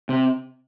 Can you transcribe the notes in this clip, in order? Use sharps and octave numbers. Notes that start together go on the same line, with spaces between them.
C3